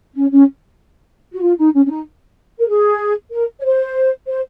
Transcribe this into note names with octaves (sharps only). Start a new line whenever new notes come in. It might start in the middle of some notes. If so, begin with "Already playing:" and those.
C#4
C#4
F#4
F4
D#4
C#4
C#4
D#4
A#4
G#4
A#4
C#5
C5
C5